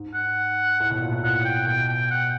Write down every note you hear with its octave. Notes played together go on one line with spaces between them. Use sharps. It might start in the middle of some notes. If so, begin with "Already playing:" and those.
Already playing: G#2
F#5
A2
B2
A#2
A2
A#2 F#5
G5
B2 G5
G5
F#5